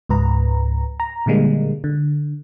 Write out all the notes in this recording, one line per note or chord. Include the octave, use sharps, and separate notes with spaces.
C#2 G#2 B4 A#5
A#5
A#2 D3 G3 G#3 A#3
D3